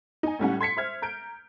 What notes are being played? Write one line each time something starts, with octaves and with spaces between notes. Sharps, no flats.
D#4 G#5
A2 G3 C#4 F#5
C6 G#6 B6 C#7
C5 E5 F6 G#6
A#5 G6 D7